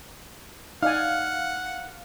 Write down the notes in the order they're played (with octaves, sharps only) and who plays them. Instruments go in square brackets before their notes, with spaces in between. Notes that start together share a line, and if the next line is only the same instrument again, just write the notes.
[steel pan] D#4 D5 G#5 [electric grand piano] F5 [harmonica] F#5 [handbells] F6